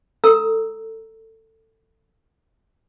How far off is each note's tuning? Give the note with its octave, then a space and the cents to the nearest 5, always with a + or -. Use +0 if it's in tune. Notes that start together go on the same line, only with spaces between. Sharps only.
A4 +20 A#5 +0 E6 +0